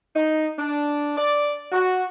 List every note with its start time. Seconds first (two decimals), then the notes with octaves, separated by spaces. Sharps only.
0.15 D#4
0.59 D4
1.18 D5
1.72 F#4